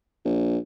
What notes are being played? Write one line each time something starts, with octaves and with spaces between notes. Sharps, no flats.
A#1